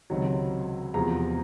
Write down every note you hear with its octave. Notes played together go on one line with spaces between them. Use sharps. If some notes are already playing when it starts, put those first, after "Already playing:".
C#2 C3 D#3 F#3
E2 C3 F3 G#3 A#5